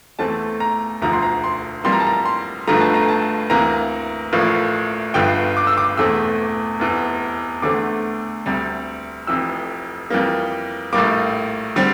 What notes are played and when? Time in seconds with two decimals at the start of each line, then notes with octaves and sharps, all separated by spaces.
0.19 E2 E3 A3 C4 A5
0.60 A#5
1.01 E1 D2 D3 F3 A#5
1.13 C6
1.23 A#5
1.44 C6
1.84 F2 E3 G3 A#3 C6
1.92 A#5
2.00 A5
2.07 A#5
2.25 C6
2.67 G1 G2 D3 F3 A3 A#5
2.81 A5
2.94 A#5
3.08 A5
3.50 D2 C3 E3 A#3 A#5
4.33 A1 A2 F3 A#3
5.14 G1 G2 D3 F3 G5
5.57 D6
5.67 E6
5.77 D6
5.97 E1 E2 E3 A3 C4 E6
6.79 F1 E2 E3
7.62 E2 D3 A3 C4 D6
8.46 D2 C3 G3
9.27 F1 F2 E3 E6
10.10 F2 E3 G3 A#3
10.93 A#1 A2 G3 A#3 D6
11.76 D3 G3 C4